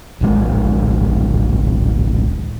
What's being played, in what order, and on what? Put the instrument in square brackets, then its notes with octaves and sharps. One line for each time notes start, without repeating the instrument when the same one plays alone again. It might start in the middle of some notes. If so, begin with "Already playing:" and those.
[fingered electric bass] D1 A#1 G#3